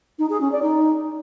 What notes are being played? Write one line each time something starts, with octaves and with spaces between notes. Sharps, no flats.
D#4
G#4
C#4
D5
D#4